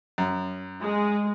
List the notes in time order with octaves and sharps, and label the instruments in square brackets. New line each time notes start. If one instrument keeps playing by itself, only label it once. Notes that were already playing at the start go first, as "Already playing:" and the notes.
[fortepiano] F#2
[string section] G#3